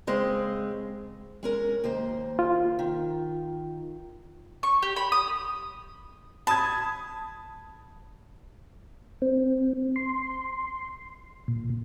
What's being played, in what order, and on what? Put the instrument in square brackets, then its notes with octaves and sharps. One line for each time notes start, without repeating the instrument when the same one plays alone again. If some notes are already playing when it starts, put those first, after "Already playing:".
[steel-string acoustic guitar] C#3 G#3 C4
G#3 C#4 A#4
D#2 A#3 C5
[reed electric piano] F4
[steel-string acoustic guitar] D#3
[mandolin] C#6
G4
B5
D#6
[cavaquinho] A5 [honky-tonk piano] B5 D#6 G#6
[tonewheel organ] C4
C6
A#2